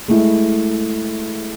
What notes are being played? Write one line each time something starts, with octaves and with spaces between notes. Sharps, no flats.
G#3 A3 E4